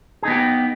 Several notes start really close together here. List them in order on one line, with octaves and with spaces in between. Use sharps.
G#4 D#4 B3 G4